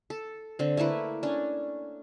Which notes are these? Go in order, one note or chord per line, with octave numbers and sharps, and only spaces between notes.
A4
D3 C4
A3 A#3 E4 B4
C#4 D4